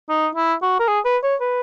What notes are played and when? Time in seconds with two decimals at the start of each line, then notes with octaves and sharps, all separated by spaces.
0.09 D#4
0.35 E4
0.62 F#4
0.80 A#4
0.87 G#4
1.05 B4
1.23 C#5
1.41 B4